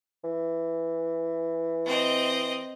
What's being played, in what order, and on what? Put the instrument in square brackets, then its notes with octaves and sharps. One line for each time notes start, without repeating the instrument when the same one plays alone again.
[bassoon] E3
[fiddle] C4 D#5